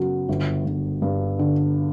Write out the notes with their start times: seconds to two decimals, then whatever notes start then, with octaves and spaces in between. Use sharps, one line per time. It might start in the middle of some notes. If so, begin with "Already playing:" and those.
Already playing: F#2 C#3 F#3 B3
0.29 G1
0.65 G1
1.02 G2
1.39 D3